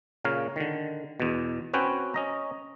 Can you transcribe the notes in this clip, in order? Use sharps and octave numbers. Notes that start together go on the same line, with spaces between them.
A#2 C#3 A#4 C#5 F5
D3 D#3
E2 B2
C4 C#4 F#4 B4 C#5 G5
C#4 D#5 A#5